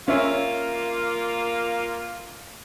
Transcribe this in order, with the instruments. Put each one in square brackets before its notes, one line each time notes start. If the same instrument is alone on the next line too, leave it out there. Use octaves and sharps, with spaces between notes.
[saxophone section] A#3 F4 [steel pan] C#4 C#5 E5